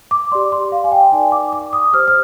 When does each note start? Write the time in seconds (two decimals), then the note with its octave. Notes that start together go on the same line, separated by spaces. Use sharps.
0.11 D6
0.32 G4 D5 C6
0.52 C6
0.72 F5
0.84 G#5
0.92 G5
1.12 D#4 A#4 D5 G#5
1.32 D6
1.53 D6
1.73 D#6
1.93 G4 C5 F6
2.08 F6